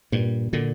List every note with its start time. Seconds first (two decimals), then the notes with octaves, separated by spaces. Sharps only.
0.12 G2 A#2
0.53 A#2 D3